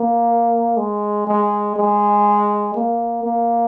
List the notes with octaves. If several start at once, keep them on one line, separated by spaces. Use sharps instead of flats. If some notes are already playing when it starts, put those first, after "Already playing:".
Already playing: A#3
G#3
G#3
G#3
A#3
A#3